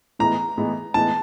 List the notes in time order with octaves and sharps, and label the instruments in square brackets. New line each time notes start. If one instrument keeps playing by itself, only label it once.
[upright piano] A2 E3 G#3 B3 D#4 [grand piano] A#5
[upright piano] A2 E3 G#3 B3 D#4
[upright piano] A2 E3 G#3 B3 D#4 [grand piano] A5